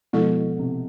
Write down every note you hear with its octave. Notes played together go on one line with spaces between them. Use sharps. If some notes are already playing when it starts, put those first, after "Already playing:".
B2 F3 G#3 B3 E4 A4
C3